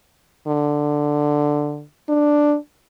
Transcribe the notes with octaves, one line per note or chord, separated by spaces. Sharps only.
D3
D4